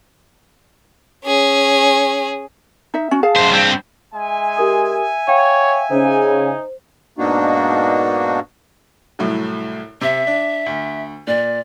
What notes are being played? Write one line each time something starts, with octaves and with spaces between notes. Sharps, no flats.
C#4 G#4
D#4 E5
C#4 F#4
G#4 F5 A5
F#2 C5
G2 C4
G#3 E5 G#5
G4 A#4 D#6
C#5 F5 G5
C#3 D#4 C5
G#2 B2 A#3 D4 D#4 F#4
C2 A2 F#3
C3 E5
D4
D2
A#2 D5